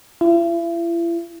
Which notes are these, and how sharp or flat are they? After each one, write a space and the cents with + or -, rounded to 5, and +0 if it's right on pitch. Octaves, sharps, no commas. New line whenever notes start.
E4 +40